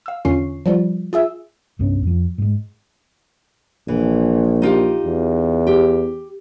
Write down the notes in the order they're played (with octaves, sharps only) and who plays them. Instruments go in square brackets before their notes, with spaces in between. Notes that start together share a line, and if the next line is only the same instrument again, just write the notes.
[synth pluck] F5 E6
E2 D3 C#4 F4 C#6 C7
F3 G3 F4
F4 G#4 E5 E6
[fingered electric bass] C2 G2 B3 C#4
F2 F3
G#2 G#3
[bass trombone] A#1 [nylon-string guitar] E3
[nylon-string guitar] D#4 F4 G4
[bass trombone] E2
[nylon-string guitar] G4